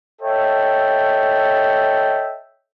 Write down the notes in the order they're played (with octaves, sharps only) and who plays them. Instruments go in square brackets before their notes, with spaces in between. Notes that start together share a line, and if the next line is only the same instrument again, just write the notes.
[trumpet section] A4 C#5 D#5 E5 G5